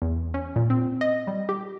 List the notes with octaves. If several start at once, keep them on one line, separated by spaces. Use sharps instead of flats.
E2
C#4
A#2
C4
D#5
G3
G4